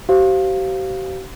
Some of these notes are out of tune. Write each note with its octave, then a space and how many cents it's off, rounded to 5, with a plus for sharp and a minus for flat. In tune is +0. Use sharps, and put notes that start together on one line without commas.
G4 -45 C5 -5 F5 +0